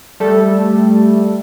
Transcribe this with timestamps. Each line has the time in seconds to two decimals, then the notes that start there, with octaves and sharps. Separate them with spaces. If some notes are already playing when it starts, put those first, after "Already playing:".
0.20 G3 A3 A4